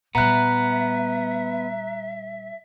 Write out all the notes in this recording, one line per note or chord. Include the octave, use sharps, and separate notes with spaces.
A#2 G3 B3 E5 A#5 F#6